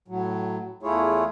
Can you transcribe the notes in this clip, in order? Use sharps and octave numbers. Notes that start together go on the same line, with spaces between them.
A2 F#3
E2 A3 E4 F4 G#4 C#5